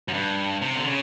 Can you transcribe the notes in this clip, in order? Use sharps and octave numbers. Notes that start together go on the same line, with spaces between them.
F#2
G2
C3
D3
C#3